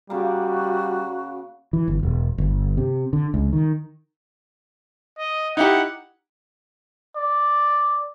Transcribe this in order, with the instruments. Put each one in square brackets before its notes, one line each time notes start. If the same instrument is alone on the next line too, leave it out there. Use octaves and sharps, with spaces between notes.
[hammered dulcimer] C#3 A#3 [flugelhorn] G3 [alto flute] F#4
[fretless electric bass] E3
G1
E1
G1
C3
D3
C#2
D#3
[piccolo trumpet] D#5
[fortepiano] D#4 E4 G4 [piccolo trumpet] F#5
[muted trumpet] D5